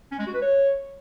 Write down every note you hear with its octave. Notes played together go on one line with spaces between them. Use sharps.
C#4
G#3
F#4
B4
C#5